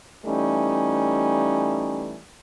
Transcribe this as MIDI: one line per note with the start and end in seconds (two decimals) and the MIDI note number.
0.25 2.17 52
0.25 2.17 55
0.25 2.17 57
0.25 2.17 61
0.25 2.17 63